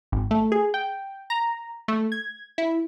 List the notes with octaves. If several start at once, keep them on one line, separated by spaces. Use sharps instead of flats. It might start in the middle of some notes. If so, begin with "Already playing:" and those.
G#1
A3
G#4
G5
A#5
A3
G#6
E4